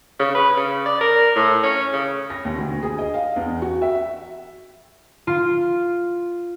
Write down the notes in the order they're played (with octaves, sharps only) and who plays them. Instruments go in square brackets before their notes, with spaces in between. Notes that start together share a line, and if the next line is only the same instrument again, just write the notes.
[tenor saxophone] C#3
B4
C#3
D5
A#4
A2
C#4
C#3
[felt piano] A#6
D#2
D2
G#4
D#5
F5
E2
F#4
E5
[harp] F4